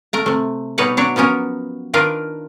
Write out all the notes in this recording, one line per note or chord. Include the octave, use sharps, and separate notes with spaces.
A3 A#4 A#5
C3 A3
B2 G3 D#4 B4 C#5 F#5
F#3 D4 C#5 E5
F3 F#3 B3 C#4 A#4
D#3 D4 F4 A#4 B4